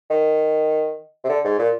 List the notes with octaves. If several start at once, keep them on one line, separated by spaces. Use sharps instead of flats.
D#3
C3
D3
G#2
A#2